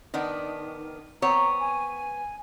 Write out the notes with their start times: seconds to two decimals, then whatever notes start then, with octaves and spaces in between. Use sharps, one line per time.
0.14 D#3 B3 D4
1.22 B3 C4 C#5 A#5
1.60 G#5